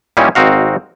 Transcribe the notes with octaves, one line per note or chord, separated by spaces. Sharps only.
A#2 G3 A#3 C#4 D#4 E4
G#1 C4 D#4 F#4 F5